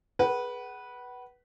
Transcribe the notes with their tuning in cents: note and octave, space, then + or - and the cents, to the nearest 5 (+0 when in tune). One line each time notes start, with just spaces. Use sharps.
G#4 +20 B4 -15 F#5 +30